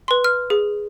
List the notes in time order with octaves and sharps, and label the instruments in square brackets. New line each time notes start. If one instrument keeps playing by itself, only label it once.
[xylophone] B4 C6
F6
G#4